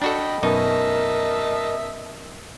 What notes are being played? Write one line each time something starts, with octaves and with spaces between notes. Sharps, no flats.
D4 F#4 A4 D#5 G5 B5
F#2 B2 D#4 A#4 D#5 E5 A5